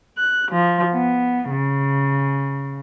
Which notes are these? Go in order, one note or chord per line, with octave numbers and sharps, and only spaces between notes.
F#6
F3
B3
C#3